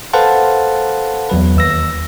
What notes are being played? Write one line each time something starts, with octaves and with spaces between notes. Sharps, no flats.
A4 B4 C5 F5 F#5 A5
E2 F#3 B4
D#2 E6 A#6